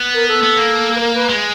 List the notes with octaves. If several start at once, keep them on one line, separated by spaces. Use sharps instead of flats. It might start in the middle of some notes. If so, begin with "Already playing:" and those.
Already playing: B3
A#4
A4
B3
A#3
B4
A#4
B4
G#3